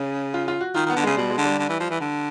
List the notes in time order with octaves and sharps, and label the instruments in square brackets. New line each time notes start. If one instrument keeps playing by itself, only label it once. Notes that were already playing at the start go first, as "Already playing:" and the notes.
Already playing: [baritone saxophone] C#3 [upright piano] C#4
[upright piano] F4
F4
F#4
[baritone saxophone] D#3 [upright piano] F4
[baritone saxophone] D#3 [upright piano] B3
[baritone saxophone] D3
[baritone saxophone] C#3 [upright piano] G#3
[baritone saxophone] B2 [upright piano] G3
[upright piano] G#3
[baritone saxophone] D3
[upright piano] G3
[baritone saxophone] D3
E3
F3
E3
D3